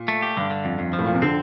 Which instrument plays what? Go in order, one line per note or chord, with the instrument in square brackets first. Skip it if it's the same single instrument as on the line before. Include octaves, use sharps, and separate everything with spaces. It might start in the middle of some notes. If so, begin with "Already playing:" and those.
Already playing: [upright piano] A#2
[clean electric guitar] A3
G4
[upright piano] G2 [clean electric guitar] D3
[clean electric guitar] D3
F2
F2
F3
[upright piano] A2
[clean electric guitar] F2 [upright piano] A#2
[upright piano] C3
[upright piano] D3 [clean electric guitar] C4